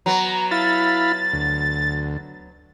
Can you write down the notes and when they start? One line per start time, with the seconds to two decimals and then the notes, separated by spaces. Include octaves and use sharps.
0.06 F#3 B3 A#5
0.51 E4 F5 B5 A6
1.33 D2